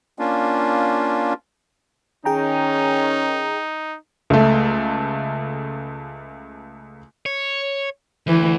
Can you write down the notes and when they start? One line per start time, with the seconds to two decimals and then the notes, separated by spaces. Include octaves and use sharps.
0.19 A#3 C#4 D4 F4
2.25 D#3 C#4 D#4 G#4 G5 A#5
4.30 C#2 A3
7.26 C#5
8.27 D2 E3